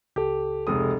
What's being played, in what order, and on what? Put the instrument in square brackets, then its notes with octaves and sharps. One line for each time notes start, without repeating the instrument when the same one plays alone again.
[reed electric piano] C#2 A4 [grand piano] G4
[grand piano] F1 G#3 D#6